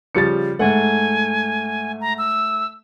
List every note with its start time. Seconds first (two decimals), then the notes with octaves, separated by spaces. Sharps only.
0.15 C#3 F3 G3 A6 C#7
0.59 G#2 A3 F#5 G#5
2.01 A#5
2.18 E6